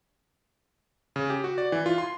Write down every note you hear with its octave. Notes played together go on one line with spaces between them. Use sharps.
C#3
G4
F#4
D5
E3
F4
C6